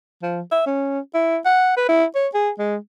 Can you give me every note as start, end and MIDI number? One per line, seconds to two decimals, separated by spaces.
0.23 0.41 53
0.52 0.61 76
0.66 0.99 61
1.14 1.38 64
1.45 1.75 78
1.77 1.86 71
1.89 2.05 64
2.15 2.28 73
2.34 2.50 68
2.59 2.76 56